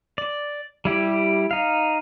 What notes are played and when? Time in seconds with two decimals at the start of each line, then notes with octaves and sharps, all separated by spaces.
0.18 D5
0.85 G3 E4 G4
1.51 D#4 F5